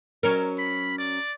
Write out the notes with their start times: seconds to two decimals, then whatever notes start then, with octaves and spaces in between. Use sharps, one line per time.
0.23 F#3 C#4 A#4
0.58 B5
0.98 D5